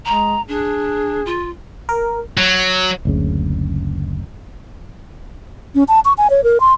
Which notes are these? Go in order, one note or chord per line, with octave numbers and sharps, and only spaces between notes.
G#3 A#5
D4 G#4
F4
A#4
F#3
F#1 D2 C#3
C#4
A5
C#6
G#5
C#5
A#4
C6